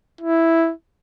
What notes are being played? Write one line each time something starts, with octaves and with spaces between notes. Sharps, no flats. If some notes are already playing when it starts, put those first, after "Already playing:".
E4